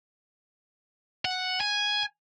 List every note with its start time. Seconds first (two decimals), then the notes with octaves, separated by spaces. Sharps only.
1.25 F#5
1.60 G#5